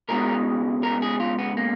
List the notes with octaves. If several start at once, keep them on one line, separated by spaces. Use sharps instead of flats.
C#2 B2 G#3 A#4
A#4
G#4
F4
B3
A#3